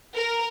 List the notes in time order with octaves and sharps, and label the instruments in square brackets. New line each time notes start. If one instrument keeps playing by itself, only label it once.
[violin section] A#4